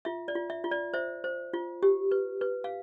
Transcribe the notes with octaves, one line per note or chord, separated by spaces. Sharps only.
F4 E5
D5
F4
E5
F4
D5
C5 E5
C5
F4
G4
B4
B4
F5